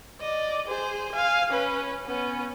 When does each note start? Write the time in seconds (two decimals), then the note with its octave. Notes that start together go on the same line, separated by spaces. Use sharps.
0.21 D5 D#5
0.68 G#4 C5
1.12 F5 G#5
1.50 C#4 B4
2.06 B3 C#4